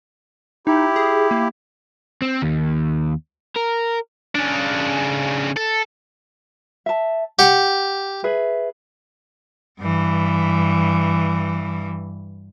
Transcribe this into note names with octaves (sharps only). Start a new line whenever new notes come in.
D#4 E4 G4
G#4
A#3
C4
D#2
A#4
C#3 D4
A4
E5 A5
G4 F#5
G#4 B4 E5
G2 E3